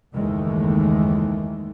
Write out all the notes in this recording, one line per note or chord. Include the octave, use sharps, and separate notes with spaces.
F#1 D#2 D#3 E3 G#3 A3